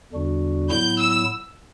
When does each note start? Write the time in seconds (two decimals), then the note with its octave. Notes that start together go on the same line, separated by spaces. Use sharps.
0.13 E2 D3 G3 D4 F#4
0.69 A2 F#3 B3 E4 G6
0.99 E6